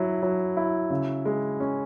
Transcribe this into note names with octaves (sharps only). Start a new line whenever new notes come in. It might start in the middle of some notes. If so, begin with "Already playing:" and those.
Already playing: F#3 E4
F#3
E4
C#3
G#3
C#4